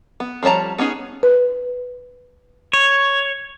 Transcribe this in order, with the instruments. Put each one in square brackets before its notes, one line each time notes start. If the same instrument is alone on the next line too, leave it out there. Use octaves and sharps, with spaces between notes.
[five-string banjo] B3
F3 G3 C#5 A5 A#5
B3 C#4 D#4 G#4
[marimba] B4
[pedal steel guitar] C#5